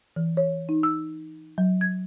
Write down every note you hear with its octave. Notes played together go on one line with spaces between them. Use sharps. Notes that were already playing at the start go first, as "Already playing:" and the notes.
E3
C#5
D#4
E6
F#3
G#6